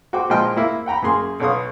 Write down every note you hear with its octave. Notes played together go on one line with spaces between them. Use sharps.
F#4 C5 G5 D6
A#2 F3 G#3 D#5 G5 F6
A#3 E4
F#5 G5 A#5 B5
F#2 A#3 G#4 C6
B1 C#5 F5 D#6